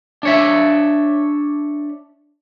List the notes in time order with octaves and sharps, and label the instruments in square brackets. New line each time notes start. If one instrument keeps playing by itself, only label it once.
[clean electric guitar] D4 C#5 E5